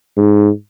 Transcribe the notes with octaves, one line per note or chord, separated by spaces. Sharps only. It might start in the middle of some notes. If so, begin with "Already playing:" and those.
G#2